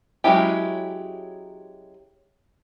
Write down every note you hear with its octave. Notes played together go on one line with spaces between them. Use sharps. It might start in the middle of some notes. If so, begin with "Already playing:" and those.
F#3 G#3 C#4 E4 G4